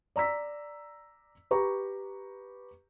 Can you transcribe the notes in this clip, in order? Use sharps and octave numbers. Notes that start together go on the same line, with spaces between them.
D5 A#5 E6 B6
G4 B4 A#5 C#6